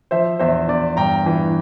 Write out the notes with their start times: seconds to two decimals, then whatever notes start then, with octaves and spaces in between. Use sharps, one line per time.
0.11 F3 C5 E5
0.39 E2 C5 E5
0.69 E2 D5
0.97 G2 G5 A#5
1.26 E3